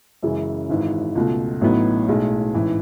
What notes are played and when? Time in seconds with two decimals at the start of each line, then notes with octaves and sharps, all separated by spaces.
0.23 F#2 C#3 E3 G#3
0.70 G#1 G#2 E3
1.15 C#2 B2 A3
1.61 A1 A2 F#3 B3 D#4
2.08 B1 A2 G#3
2.54 A1 G#2 E3